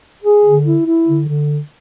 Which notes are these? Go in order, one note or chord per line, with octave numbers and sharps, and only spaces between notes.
G#4
D3
E4
E4
D3
D3